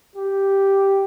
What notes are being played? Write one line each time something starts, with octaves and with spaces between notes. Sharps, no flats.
G4